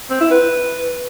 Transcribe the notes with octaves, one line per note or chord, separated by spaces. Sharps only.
C4
E4
B4